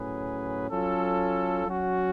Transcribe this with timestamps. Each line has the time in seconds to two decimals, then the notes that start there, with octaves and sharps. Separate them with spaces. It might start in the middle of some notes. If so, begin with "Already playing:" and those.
Already playing: A2 F#3 C#4 G#4 B4
0.68 F#3 C#4 F4 A4
1.66 F#3 C#4 F#4